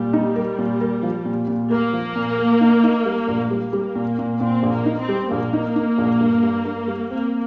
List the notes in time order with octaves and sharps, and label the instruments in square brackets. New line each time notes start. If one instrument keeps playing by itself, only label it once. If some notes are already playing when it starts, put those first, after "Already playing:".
Already playing: [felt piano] A#2 [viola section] G3
[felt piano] D#4
A#4
A#2
A#4
F3
A#2
A#2
[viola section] A#3 [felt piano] A#4
[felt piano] F3
A#2
A#4
D#4
D#4
G3
A#1
[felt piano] G3 [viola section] A#3
[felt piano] G3
A#2
A#2
[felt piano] A#2 [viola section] C4
[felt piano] A#1
[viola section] A#3
[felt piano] D#4
[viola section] C4
[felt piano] G3
[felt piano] A#1 [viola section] A#3
[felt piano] D#4
D#4
A#1
G2
G2
G2
G3
[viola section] A#3 [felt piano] C4